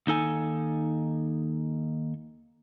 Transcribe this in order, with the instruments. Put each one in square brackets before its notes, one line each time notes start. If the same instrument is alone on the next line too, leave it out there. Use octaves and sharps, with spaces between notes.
[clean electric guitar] D#2 D#4 A4 G#5